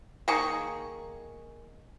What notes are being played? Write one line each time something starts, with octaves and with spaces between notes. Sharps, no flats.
D#3 A#3 G#4 C#6